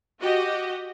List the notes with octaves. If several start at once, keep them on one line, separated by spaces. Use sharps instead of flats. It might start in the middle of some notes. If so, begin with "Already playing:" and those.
F#4 G4 D#5